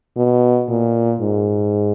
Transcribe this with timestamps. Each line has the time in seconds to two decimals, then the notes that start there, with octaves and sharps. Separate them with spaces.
0.17 B2
0.69 A#2
1.21 G#2